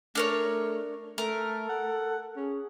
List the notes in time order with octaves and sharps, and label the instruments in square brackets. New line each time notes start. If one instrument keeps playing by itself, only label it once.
[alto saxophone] A3 [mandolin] D4 A#4 C#5
[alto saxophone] A3 [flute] A4 [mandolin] A#4
[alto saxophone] F#5
[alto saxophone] C#4 [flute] G#4